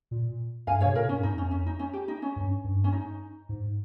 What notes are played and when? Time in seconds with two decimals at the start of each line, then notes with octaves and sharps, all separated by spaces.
0.11 A#2
0.67 G2 F5 G#5
0.81 C#5 F5
0.86 C3
0.95 A#2 A#4
1.05 G#2 C#4
1.14 G2
1.23 F2 D#4
1.38 C#4
1.51 C#4
1.66 D#4
1.79 C#4
1.93 G4
2.08 D#4
2.22 C#4
2.36 G2
2.64 G2
2.84 C#4
2.92 D#4
3.49 G#2